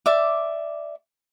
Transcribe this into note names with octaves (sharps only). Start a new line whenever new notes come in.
D5 E5 D6